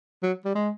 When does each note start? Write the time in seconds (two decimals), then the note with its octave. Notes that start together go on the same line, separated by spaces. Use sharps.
0.23 F#3
0.45 G3
0.55 G#3